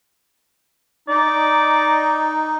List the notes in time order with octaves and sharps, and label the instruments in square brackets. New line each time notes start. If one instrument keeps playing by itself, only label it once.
[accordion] D#4 [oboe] D5